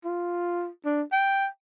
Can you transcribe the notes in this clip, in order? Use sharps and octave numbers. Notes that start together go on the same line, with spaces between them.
F4
D4
G5